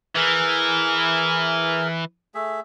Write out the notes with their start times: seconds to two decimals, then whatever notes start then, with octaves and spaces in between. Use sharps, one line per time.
0.16 E3 G#4 A#4
2.34 A3 G#4 E5